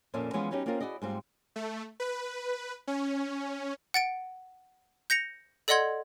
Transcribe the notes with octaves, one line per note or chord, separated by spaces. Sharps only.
F2 A#2 C#4 D5 E5 A5
E3 F3 G#3 B3 C#4 F4
F#3 B3 C#4 D#4 F4 G4
A#3 C4 C#4 F4 A4 A#4
E4 F#4 G#4 D5 D#5
G#2 G3 C4 F4
A3
B4
C#4
F#5 A6 D7
G6 A#6 C#7 F7
A4 D5 D#5 F#5 C6 G#6